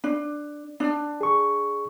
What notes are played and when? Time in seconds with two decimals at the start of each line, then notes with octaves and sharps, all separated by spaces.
0.04 D4
0.80 D4
1.21 G#4 C#6